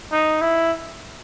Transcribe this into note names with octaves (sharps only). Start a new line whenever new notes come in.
D#4
E4